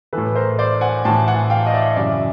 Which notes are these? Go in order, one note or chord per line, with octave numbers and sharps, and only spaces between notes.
A2 E3 A4 B4
A#4 C5
C5 D5
F#5 G#5
A2 E3 G5 A5
F#5 G#5
F5 G5
D#5
D5 E5
F#2 C#3 E3 D5 E5